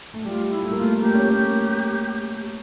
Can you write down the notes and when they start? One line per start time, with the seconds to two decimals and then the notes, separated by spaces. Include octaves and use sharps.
0.14 A3
0.25 G3 F4
0.50 E4
0.63 A3
0.72 A#3
0.76 F4
0.81 A3
1.02 A#3 G4
1.15 C#4
1.29 A#3